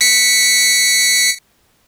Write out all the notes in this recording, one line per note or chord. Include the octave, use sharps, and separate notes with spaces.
B6 C#7